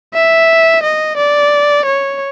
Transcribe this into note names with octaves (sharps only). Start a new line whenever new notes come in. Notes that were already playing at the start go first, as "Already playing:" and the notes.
E5
D#5
D5
C#5